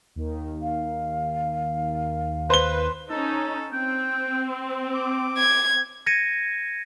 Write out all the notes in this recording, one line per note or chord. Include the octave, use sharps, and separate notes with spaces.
D#2 D#3
F5
B4 C5 G7
C#4 D#4 A4
C4 G5
D6
G#6
G#6 A#6 C#7 D#7